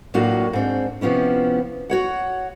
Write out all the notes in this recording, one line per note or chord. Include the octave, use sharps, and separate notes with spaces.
A2 F#3 A#3 D4 F4 F#4
G#2 C4 D4
C3 F3 B3 C#4 E4
F#4 C#5 F#5